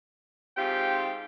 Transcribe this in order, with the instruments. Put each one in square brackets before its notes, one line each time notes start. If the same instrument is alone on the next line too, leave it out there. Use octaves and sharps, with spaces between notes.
[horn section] G#2 C4 F4 G4 G5